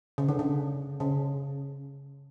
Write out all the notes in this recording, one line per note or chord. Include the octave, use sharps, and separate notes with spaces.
C#3
D3
C#3
C#3